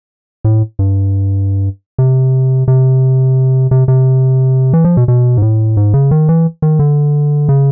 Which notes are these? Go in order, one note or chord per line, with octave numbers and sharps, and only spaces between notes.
A2
G2
C3
C3
C3
C3
E3
F3
B2
B2
G#2
A2
G#2
C#3
D#3
E3
D#3
D3
C#3